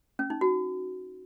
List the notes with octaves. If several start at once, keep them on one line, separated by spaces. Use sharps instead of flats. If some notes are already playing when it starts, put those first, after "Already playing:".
C#4
D#4
F#4